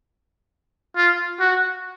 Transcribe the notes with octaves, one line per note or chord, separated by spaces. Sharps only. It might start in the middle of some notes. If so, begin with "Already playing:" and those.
F4
F#4